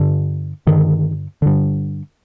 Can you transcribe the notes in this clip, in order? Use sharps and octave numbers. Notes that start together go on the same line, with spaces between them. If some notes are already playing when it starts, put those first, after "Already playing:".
Already playing: G2 D3
G2 D3 D#3
G2 D3